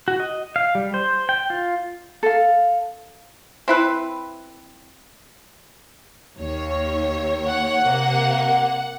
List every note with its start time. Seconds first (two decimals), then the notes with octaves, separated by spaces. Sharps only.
0.08 F#4
0.20 D#5
0.56 F5
0.75 G3
0.94 C5
1.29 G5
1.50 F4
2.23 A4 F5
3.68 C4 E4 B4
6.39 D#2 C#5
7.46 F#5
7.84 C3 A#3